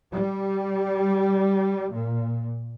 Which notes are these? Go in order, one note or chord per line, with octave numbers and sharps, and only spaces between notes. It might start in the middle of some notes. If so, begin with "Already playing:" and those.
G3
A#2